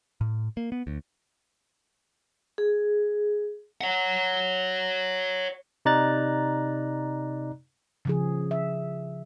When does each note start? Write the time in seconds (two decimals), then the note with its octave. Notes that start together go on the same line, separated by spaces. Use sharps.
0.21 A2
0.57 A#3
0.72 B3
0.87 D2
2.58 G#4
3.81 C#5 F#5
5.85 C3 D#4 D5 A#5 F#6 A6
8.05 C#3 F3 G#4
8.51 E5